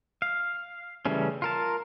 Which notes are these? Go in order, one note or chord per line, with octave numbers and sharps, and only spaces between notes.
F5
C#3 E3 G3 A3 C#4
F4 A#4 A5